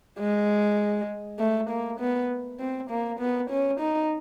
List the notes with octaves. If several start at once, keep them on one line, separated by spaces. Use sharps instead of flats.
G#3
A3
A#3
B3
C4
A#3
B3
C#4
D#4